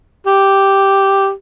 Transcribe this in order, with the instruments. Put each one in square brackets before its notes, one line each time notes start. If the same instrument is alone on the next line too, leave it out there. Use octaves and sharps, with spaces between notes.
[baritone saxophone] G4